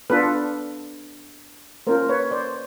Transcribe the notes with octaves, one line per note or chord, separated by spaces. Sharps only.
B3 D4 F4 A4 B4
A#3 C#4 F4 A#4 C5
B4 C#5
C5 D5